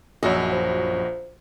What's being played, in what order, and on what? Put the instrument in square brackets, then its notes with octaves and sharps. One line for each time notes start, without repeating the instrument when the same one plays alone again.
[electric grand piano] A#1 F#4 D#5 [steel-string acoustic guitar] F#2
[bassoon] F3